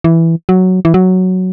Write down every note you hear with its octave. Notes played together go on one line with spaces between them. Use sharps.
E3
F#3
E3
F#3